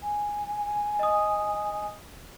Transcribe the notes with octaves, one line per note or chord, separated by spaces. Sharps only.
G#5
D#5 D#6